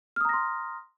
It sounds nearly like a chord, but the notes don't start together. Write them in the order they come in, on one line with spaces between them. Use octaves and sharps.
F6 D#6 A#5 A#6 C6